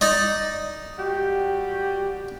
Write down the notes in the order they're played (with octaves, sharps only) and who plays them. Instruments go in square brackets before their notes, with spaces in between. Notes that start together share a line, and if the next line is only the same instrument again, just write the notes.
[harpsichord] D#4 D5 D#5
[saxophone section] G3 F#4 G4